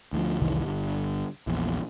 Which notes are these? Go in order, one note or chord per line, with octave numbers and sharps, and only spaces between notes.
D2 D#3 F3
F1 C2 D#3 E3
G1 G2
A#1 E2